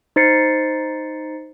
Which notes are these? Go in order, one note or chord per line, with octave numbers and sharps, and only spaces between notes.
D#4 C5 A6 C7 C#7